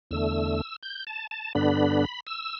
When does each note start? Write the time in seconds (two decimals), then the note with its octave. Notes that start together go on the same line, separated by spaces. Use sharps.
0.11 E2 D3 A3 E6
0.83 G6
1.07 A5
1.31 A5
1.55 G2 D3 B3 D4 B5
2.27 E6